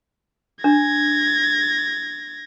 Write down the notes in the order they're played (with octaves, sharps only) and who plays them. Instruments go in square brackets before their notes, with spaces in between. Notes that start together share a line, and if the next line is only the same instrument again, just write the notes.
[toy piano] D4 [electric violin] G#6 A#6